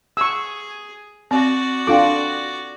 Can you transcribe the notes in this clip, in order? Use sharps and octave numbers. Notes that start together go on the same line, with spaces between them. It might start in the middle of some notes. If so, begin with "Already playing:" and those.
G#4 C#6 E6
C4 F#4 D5
D4 F4 A4 F5 G5 D6